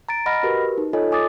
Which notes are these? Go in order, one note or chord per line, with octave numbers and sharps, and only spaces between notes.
A#5 A6 D7
D#5 F#5 B5 F6 A#6
F#4 G4 A#4 B4
D#4
F4 A4 C#5 D#5 G#5
G#5 D6 D#6 A6